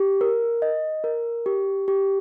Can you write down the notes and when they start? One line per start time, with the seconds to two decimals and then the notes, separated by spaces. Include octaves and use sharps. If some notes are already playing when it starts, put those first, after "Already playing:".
Already playing: G4
0.21 A#4
0.62 D#5
1.04 A#4
1.46 G4
1.88 G4